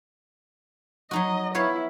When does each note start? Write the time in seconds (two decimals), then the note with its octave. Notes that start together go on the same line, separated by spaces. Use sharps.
1.11 F#3 D#4 F#4 D#5
1.55 B3 E4 C#5 F5